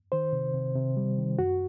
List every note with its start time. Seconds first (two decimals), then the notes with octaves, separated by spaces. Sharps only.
0.12 D#3 C5
0.33 C3
0.54 C3
0.75 C3
0.97 G3
1.18 D#3
1.39 F#2 F#4